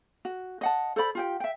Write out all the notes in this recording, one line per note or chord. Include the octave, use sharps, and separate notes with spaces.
F#4
D#5 F#5 A5
A4 C5 D5 B5
F4 G4 G5
E5 G5